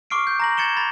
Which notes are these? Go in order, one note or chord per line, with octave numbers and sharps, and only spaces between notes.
C#6 D6 F6 C7 D7
G6
A#5 A#6 F#7
G#6 A6 C#7 E7 G7
B5 A6